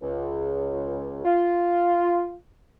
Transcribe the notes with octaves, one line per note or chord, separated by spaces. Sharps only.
C#2
F4